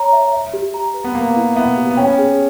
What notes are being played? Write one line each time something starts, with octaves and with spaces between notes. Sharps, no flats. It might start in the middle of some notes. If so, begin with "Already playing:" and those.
Already playing: C#5 A#5
E5
E5
G4
A#5
B4
B3
A#3 B4
E4
B3 E5
G4
B3
C#4 G5
G#4